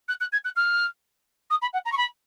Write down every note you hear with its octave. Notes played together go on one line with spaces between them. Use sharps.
F#6
F#6
G#6
F#6
F6
D#6
B5
F#5
A#5
C#6
B5